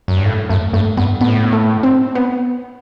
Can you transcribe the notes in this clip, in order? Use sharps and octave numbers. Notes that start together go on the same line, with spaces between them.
F#2
G2
A2 A3
F#2 A3
G2 A3
G2 B3
A2 B3
A3
C4
B3